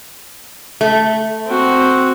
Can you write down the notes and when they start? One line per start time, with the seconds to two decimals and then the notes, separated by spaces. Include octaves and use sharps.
0.81 A3
1.46 C4 F#4